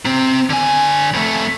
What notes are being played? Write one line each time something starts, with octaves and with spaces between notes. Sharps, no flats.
C3 C4
D3 G#5
F2 A3